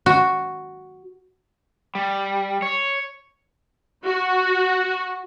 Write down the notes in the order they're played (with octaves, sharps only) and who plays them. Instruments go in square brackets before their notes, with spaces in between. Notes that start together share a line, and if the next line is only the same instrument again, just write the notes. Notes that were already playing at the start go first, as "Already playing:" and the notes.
[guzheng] F#4
[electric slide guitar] G3
C#5
[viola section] F#4